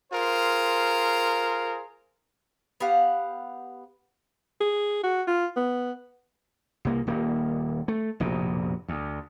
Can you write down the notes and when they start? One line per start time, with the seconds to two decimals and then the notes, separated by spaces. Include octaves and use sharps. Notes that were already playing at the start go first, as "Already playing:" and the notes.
0.12 F4 G#4 A#4 C5
2.80 B3 G4 F5 F#5
4.61 G#4
5.04 F#4
5.27 F4
5.56 B3
6.85 C2 A#3
7.07 D#1 A#3
7.88 A3
8.20 F1 A#1 B2
8.88 D2